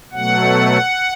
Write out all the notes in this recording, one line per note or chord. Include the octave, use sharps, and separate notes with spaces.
B2 F#3 A3 F#5